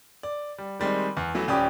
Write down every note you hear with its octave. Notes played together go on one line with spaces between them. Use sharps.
D5
G3
D#3 G3 G#3 C4
E2
E3 F#3 A3 B3
D#1 C#4 G4 D5 B5 D#6